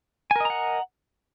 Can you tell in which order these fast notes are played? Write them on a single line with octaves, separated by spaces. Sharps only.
G#5 A#4 D#5 A#5 F#5